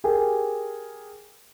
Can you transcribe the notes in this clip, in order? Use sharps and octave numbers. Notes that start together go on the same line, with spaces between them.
G4 G#4 A#4